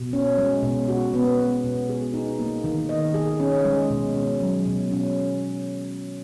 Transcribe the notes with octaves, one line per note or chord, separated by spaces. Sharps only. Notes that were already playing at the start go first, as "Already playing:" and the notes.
Already playing: B2
C#4
G#3
B2
F#4
B3
G#3
B2
G#4
D#4
A#3
D#3
D#5
G#4
C#4
G#3
B2
C#4
F#3
B2
C#4